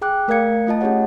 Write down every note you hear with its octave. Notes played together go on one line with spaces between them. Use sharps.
G#4 G5 D6 F#6
A3 A#4 D5 F5 G#6 C#7
A3 F4 D#5 A5
C#4 G4 G#4 C#5 F#5